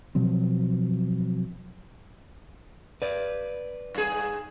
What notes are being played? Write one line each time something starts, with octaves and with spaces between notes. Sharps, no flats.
B2 F3 F#3 C4
B4 D5
G2 G#4